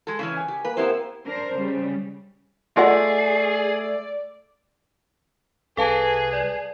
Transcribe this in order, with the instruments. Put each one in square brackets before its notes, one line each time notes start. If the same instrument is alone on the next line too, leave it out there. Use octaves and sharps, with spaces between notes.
[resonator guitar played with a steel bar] G#3 A4
C#3 E3 C#4
[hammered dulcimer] G#5
[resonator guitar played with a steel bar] G4
[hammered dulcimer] A#3 [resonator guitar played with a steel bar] B4
[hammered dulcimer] C3 [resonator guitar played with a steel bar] B3 E4 C5
[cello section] D4 A#4 C5
C#3 G3
[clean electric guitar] A3 [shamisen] F4 D#5 F#5 [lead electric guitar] G#4 [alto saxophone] D5
[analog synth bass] C2 [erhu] G#4 [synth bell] A4 F5 A5 [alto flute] B4
[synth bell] D5